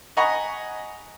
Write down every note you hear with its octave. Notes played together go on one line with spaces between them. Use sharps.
D#5 F#5 G#5 A#5 B5 C#6